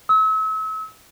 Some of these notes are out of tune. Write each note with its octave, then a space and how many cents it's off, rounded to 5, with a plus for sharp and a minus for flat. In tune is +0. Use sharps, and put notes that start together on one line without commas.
E6 -40